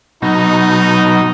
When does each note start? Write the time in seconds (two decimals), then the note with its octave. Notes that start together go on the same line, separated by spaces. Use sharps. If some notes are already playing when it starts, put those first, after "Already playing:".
0.22 B2 F#3 D#4